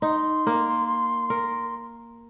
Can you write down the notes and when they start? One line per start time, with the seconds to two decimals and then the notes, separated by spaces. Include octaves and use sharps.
0.02 D#4 C6
0.47 A#3
1.30 A#4